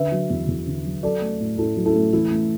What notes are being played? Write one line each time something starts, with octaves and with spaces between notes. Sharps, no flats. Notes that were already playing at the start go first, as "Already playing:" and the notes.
Already playing: D3 B4 E5
F#3
E2
E2
D3
F#3
F#3 A4 D5
A3
A2
A2 E4 A4
F#3
E4 A4
A3
E3 E4
A3